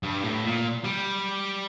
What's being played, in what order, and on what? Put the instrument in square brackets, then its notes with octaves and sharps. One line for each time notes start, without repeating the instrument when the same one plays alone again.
[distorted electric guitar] G2
A2
A#2
G3